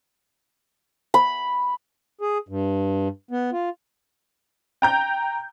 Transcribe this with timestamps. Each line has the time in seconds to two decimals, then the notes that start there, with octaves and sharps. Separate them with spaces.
1.14 B5
2.21 G#4
2.48 G2
3.31 B3
3.52 F4
4.82 G5 A#5 G6